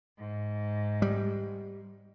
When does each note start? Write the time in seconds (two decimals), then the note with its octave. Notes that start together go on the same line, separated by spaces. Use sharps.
0.16 G#2
1.02 G3